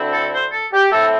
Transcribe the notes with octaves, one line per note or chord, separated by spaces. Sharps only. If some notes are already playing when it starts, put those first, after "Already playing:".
Already playing: D2 D3 C4 E4
A4
C5
A4
G4
A2 A3 C4 E4 A4